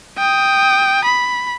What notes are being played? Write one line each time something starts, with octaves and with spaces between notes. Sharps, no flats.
G5 D#6
B5